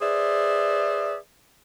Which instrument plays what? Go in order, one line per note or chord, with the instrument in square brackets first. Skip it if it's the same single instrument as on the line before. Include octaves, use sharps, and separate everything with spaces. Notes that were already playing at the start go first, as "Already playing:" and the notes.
[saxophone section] G#4 B4 C5 D5 E5